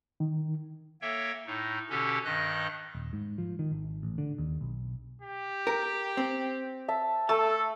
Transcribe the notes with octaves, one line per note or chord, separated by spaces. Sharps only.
D#3
A#3 A4 C#5 E5 G5
A2 D#4
B2 D3 C#4 G4 A4
G2 D#3 D#5 F#6
D#1
G#2
F3
D#3
G#1
A1
D3
D#2
B1
G4
A#4
C4
E5 A5
A3 A4 A5